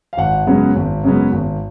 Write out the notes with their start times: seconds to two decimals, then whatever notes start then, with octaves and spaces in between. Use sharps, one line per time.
0.13 F5
0.17 G#1 F#5
0.47 F#2 C#3 G#3 B3
0.76 G#1
1.04 F#2 C#3 G#3 B3
1.32 G#1